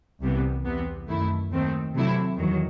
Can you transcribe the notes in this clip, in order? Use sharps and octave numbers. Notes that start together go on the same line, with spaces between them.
C2 C3 E3 G3 B3
E2 C3 E3 B3
F#2 D#3 A3 E4
D#2 D#3 A3 C4
C3 F#3 A3 E4
E2 D#3 F#3